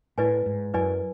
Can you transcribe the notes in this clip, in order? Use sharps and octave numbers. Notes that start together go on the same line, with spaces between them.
A2 E4 B4 D5 G#5
G#2
F#2 E4 B4 D5 G#5